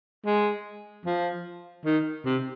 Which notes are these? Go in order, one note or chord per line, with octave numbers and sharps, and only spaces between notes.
G#3
F3
D#3
C3